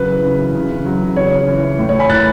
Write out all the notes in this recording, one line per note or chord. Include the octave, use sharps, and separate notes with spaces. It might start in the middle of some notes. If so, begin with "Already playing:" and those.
Already playing: C#3 F#3 B4
E3
C#3
E3
C#3
C#3
F#3
C#3
C#3 C#5
C#3
E3
E3
A2
E3 C#5
G#5 B5
A2 F#6 A6